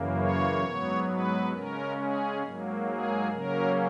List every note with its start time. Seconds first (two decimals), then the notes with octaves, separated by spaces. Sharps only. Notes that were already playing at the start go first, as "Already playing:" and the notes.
Already playing: F#2 C#3 E3 A#3
0.19 C#5
0.64 G#2 F#3 B3
1.09 B4
1.53 C#3 G#3 C#4 A#4
1.98 G#4
2.43 G#2 F#3 A#3
2.88 G#4
3.32 C#3 F#3 A#3 C#4 A#4